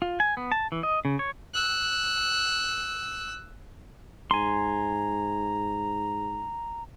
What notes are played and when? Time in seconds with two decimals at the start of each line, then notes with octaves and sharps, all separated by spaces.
0.02 F4
0.20 G#5
0.37 B3
0.52 A5
0.72 E3
0.83 D#5
1.05 C#3
1.19 C#5
1.54 E6 F#6
4.31 G#2 G#5 A#5 C6